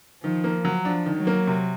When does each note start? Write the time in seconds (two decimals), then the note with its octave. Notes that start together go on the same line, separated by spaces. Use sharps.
0.23 D#3 F3
0.44 A#3
0.65 F#3
0.85 F3 D4
1.06 D#3
1.16 F#3
1.27 A#3
1.47 C3